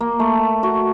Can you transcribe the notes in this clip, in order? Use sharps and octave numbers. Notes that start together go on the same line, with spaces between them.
A#3
A3
F#4